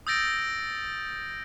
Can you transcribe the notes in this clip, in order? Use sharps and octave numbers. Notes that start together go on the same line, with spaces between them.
D#6 E6 G6 A6 A#6 D7